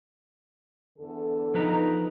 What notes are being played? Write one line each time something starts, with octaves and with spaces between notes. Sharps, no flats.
E2 D3 A4
F3 D#4 B4 A#5